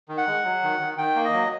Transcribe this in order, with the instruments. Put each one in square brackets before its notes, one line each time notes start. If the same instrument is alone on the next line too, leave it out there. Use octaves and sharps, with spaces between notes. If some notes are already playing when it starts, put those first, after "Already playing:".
[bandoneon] D#3
F#5
G#3
F#3
D#3
D#3
D#3 G5
A#3
D#5
F#3